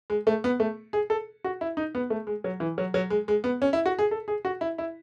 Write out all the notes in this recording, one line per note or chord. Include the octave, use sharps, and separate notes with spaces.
G#3
A3
B3
A3
G#4
A4
F#4
E4
D#4
B3
A3
G#3
F#3
E3
F#3
F#3
G#3
G#3
B3
C#4
E4
F#4
G#4
A4
G#4
F#4
E4
E4